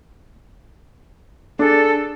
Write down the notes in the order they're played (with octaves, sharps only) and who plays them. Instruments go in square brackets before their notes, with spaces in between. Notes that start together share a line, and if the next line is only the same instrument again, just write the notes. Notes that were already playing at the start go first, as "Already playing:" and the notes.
[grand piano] D4 G#4 [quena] A4